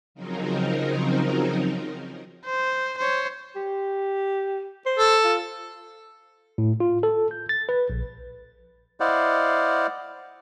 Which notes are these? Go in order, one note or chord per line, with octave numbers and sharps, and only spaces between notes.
C#3 F3 F#3 C4 D#4 A#4
C5
C5 C#5
G4
C5
A4
F4
A2
F4
A4
G6
A6
B4
A#1
E4 C5 D5 D#5 F5 F#5